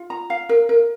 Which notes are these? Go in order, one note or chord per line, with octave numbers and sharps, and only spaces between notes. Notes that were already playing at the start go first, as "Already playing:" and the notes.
Already playing: F4
A#5
F5
A#4
A#4